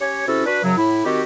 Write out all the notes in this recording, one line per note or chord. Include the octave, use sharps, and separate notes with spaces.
C#4 G4 C#5
C3 C#4 E4 F#4 A4
D4 F#4 B4
F#2 C#3 F#3
A2 E4
D#3 C4 F#4 G4